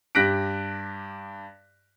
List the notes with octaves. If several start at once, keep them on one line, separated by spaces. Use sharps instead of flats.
G2 G4 F#6 A#6 B6 D7